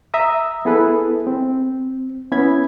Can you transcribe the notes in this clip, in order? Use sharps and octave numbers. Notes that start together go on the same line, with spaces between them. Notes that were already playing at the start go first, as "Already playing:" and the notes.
E5 A#5 D#6
B3 E4 G#4 A4 B4
C4
B3 C#4 E4 B5 G#6